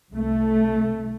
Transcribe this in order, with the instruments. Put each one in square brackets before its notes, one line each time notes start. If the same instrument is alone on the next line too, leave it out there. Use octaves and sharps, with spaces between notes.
[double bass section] C2 A3